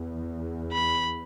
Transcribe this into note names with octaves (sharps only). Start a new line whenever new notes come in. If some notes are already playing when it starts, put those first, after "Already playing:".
Already playing: E2
B5